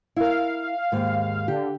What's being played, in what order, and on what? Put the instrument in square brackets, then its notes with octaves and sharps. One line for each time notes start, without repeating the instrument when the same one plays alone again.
[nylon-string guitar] E4 A#4 [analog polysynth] F5
[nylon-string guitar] D#2 G#2
[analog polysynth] D3 [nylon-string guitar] G4